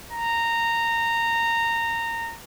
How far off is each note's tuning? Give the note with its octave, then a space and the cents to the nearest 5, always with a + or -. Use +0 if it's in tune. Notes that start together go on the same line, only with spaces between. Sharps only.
A#5 -15